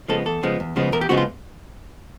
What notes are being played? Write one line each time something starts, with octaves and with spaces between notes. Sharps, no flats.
C#3 F3 G#3 B3 A4
E2 A4
C#3 F3 G#3 B3
E2
C#3 F3 G#3 B3
E2 A#4
G4
C#3 F3 G#3 B3 F#4
F4